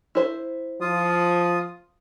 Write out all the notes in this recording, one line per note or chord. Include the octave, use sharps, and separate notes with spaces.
E4 C5
F3 F4 D#6